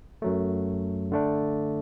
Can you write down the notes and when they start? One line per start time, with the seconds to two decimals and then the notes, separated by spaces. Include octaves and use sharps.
0.22 F#2 F#3 A3
1.12 D3 A3 D4